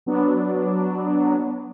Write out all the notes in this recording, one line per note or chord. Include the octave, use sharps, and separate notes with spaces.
F#3 B3 D4